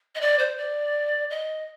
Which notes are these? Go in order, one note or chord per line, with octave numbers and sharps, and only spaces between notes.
D#5
D5
C5
D5
D#5